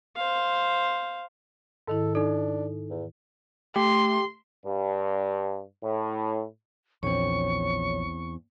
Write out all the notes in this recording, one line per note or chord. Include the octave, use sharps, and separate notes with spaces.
C5 F5
G#2 D#3 E4 A4
D4 D#4 A4
E2
A3 G4 C6
G2
A2
A#1 E2 C4 C#5 C#6